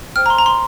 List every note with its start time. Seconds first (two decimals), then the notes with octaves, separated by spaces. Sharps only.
0.16 C5 G5 F6
0.26 A#5
0.30 C6
0.38 A#5
0.46 C6